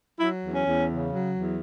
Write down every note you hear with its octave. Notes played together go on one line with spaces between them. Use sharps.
F#3 E4
E2
C#4
E2
C#3
F#3
E2